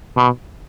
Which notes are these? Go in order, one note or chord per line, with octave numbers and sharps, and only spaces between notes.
B2